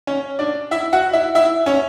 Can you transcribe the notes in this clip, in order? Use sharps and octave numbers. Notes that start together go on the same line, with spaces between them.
C#4 C#5
D4 D5
E4 E5
F#4 F#5
E4 E5
E4 E5
C#4 C#5